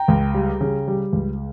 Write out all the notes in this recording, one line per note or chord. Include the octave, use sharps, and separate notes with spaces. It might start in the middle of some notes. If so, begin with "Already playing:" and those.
Already playing: G5 A#5
C#2
G3
C#3
G3
C#2